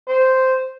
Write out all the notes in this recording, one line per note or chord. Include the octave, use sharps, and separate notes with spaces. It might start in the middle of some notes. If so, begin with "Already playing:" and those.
C5